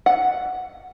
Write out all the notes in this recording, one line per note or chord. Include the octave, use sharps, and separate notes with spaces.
F#5